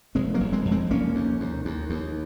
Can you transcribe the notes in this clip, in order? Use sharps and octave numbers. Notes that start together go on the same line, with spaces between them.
F1 G#3 C4
F#3 A#3
F1
G#3 C4
F2
G#3 C4
F1 A#3 C#4
D#2
D#2
D#2
D#2